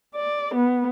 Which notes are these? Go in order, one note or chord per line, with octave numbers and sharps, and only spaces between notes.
D5
B3